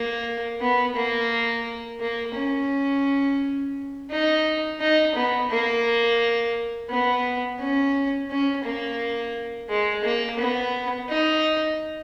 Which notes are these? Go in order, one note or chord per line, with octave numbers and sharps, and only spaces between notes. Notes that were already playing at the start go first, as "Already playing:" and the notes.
Already playing: A#3
B3
A#3
A#3
C#4
D#4
D#4
B3
A#3
B3
C#4
C#4
A#3
G#3
A#3
B3
D#4